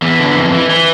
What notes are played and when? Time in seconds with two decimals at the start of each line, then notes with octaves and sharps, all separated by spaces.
0.02 E2 E3
0.19 D3
0.36 F2
0.53 E3
0.70 E3